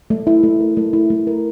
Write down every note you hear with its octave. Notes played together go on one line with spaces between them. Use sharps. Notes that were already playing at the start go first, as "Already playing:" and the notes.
A3
E4
A3
A#4
A3
E4
A3
A#4